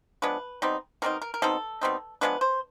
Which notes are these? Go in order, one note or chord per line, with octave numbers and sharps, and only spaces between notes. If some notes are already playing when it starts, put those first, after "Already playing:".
F3 G#3 B3 D4 B4
B2 G3 C4 D#4
B2 G3 C4 D#4 A#4
A#4
A#4
B2 G3 C4 D#4 A4
B2 G3 C4 D#4
F3 G#3 B3 D4 B4
C5